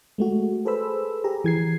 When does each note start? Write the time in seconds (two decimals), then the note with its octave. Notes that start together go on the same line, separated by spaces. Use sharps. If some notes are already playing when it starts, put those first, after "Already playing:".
0.18 G#3 A3 F#4
0.65 G#4 A4 B4 C5 B5 E6
1.24 G4 G#4 A#5
1.44 E3 G#6 C7